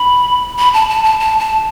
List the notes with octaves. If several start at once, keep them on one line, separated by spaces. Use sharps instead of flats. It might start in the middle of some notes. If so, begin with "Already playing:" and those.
Already playing: B5
B5
A5
A5
A5
A5
A5